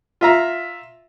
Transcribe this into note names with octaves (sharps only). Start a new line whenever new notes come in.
F4 E5 A#5